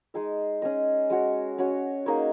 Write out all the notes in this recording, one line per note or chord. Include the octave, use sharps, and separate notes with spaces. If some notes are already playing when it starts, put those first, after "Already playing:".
G#3 D#4 G#4 D#5
C#4 G#4 D#5
G#3 F#4 C#5
C#4 F#4 C#5
A#3 D#4 G#4 C#5